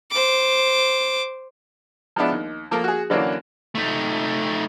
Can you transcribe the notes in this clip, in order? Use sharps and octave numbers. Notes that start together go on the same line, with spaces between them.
C5 D6
F3 G#3 B3 D4 E4
D#2
F3 A#3 A4 A#4
F#4 G#4
D3 E3 F#3 A#3 C#4 D4
A3 D#4